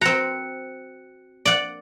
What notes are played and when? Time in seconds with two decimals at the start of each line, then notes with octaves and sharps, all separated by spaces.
0.01 C4 F#4 A#5 F#6 C#7
1.45 D5 F#5